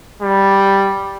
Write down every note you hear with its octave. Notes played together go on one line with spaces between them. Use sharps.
G3